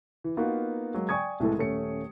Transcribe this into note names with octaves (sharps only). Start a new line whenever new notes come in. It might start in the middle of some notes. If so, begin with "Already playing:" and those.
E3
A#3 B3 D#4 F4 F#4 B4
F#3 G#3 A#3
D5 G5 G#5 C#6 D#6 G#6
C2 A2 E3 G#3 A4
D#1 A3 C#4 C#7